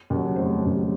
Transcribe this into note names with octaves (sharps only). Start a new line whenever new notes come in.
D#2 C#3 F#3
F1 C5
D#2 C#3 F#3